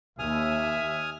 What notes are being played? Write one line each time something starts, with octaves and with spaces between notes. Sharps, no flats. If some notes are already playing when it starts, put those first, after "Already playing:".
D#2 E5 G#5 D#6 F6